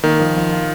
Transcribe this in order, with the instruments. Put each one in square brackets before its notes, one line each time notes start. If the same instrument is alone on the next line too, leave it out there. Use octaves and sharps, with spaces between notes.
[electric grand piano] D#3 [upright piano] A#3
[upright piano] F3
F3
F4